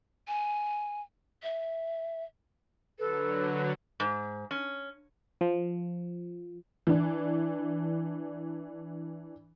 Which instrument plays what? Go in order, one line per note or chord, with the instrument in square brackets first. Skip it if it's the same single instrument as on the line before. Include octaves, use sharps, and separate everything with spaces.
[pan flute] G#5
E5
[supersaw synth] D3 F#3 [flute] A4 [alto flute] B4
[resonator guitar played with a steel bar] G#2
C#4
[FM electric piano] F3
[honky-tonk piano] E3 D4